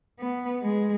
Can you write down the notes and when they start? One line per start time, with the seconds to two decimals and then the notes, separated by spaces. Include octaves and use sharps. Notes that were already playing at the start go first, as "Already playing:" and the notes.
0.19 B3
0.62 G#3